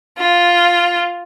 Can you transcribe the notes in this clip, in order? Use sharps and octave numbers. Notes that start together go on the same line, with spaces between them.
F4